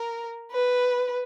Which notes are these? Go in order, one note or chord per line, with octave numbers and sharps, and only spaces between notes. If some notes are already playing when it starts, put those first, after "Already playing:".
Already playing: A#4
B4